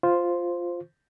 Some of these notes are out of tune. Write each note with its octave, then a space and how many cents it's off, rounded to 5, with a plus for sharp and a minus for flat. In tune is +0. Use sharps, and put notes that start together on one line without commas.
F4 +0 C5 +0